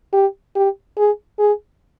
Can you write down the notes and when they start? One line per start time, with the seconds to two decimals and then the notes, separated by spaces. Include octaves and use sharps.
0.13 G4
0.55 G4
0.97 G#4
1.39 G#4